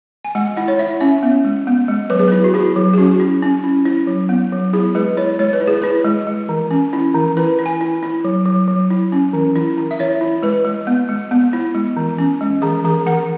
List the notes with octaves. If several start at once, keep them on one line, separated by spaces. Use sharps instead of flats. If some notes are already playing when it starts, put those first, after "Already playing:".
G#5
G#3 F#5
E4 F#5
C#5
E4 E5
C#4 E5
B3
G#3
B3
G#3
F#3 B4
G#4
E4 B4
F#4
E4 G#4
F#3
G#4
C#4 F#4
E4
C#4
E4
E4
F#3
B3
F#3
E4 G#4
G#3 B4
E4 C#5
G#3 C#5
B4
E4
G#4
E4 B4
G#3
G#3
E3
C#4
E4
E3
E4 B4
E4
G#5
E4
E4
F#3
F#3
F#3
E4
C#4
E3
E4
E3
E5
E4 C#5
E4
G#3 B4
G#3
B3
G#3
B3
E4
G#3
E3
C#4
G#3
E3 G#4
E3 G#4
E3 F#5